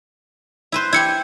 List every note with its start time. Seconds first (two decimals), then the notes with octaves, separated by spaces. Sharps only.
0.72 E4 B4 C5
0.93 E4 G4 G#6 C#7